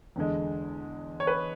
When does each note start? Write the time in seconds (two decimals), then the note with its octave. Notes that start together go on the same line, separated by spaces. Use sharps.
0.16 E2 D3 G#3
1.20 C#5
1.27 B4